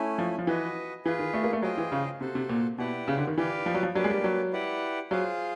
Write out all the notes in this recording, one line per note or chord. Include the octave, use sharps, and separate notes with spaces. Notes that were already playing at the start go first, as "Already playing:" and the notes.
Already playing: A3 C#4 E4
F3
F3
E3 F#4 B4 D#5
E3 F4 G#4 B4
D#3
A3
A#3
A3
F#3 F4 G#4 C5 D#5 G5
E3
C#3
C3 F#4 A4 C5
C3
A#2
B2 E4 G4 B4 D5 F#5
C#3
D3
D#3
E3 G4 B4 D5 F5
F3
F#3
F3
F#3 A#3 D4 G4 B4 D5
G#3
G3
F#3
E4 G4 B4 D5 F#5
F#3 F4 G#4 C5 F5